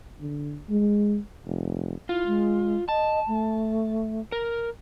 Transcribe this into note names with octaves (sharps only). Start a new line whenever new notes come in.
D3
G#3
F1
E4 F4
G#3
D#5 A5
A3
A#4